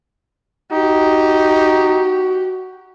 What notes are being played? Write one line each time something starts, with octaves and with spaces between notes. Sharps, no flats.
D#4 F#4 G4